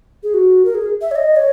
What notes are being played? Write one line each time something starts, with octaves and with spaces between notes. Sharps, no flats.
G#4
F#4
A#4
G#4
E5
C#5
D#5
C#5